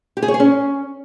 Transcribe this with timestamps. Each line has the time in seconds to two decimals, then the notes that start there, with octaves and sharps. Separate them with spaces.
0.17 G4
0.22 G#4
0.28 C#5
0.34 G#4
0.40 C#4